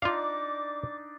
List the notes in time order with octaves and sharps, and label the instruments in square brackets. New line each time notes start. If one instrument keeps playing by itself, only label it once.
[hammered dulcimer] D4 D#4 D5 [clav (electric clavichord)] F4 F5 [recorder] D6